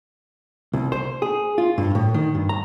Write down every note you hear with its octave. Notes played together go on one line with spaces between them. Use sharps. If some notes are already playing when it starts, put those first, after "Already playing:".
C2
C5
G#4
F4
G2
A2
D#3
G2
A#5